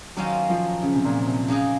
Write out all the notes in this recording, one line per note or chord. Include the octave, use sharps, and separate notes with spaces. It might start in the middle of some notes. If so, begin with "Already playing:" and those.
D#3 F#3 A#3 C#4 F4 C5
F3
C#3
C3
A#2
C3
C#3 F#3 A#3 D#4 G#4